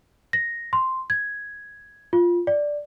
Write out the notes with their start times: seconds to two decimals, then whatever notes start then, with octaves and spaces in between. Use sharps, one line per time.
0.33 A#6
0.73 C6
1.10 G#6
2.13 F4
2.47 D5